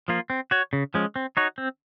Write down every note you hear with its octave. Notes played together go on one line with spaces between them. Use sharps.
F3 A#3 F4
C4
F#4 C#5
C#3
F3 G#3 C#4
C4
D#4 F#4 C#5
C4